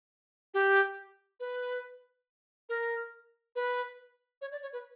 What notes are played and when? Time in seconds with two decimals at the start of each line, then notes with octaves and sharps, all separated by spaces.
0.54 G4
1.40 B4
2.69 A#4
3.56 B4
4.41 C#5
4.52 D5
4.62 C#5
4.73 B4